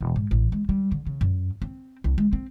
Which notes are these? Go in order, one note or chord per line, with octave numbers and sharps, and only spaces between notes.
E1
G#2
A1
G#3
G3
D3
C#3
F#2
C4
C2
G#3
C4